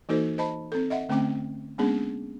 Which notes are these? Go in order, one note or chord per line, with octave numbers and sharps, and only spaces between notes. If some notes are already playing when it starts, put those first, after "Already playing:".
E3 A#3 D#4 F#4 A4 C5
C5 D#5 A5 B5
C4 A4
D#5 E5 F#5
D3 A3 C4 C#4 G5 D6
G#3 A#3 B3 C#4 D4 G#4